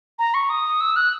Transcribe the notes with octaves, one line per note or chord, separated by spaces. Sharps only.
A#5
C#6
D#6
E6
F#6